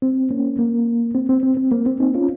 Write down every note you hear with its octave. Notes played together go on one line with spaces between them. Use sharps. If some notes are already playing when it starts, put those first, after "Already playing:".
C4
A#3 C#4
A#3
C4
C4
C4
C4
A#3
C4
C4 D#4
C#4 F4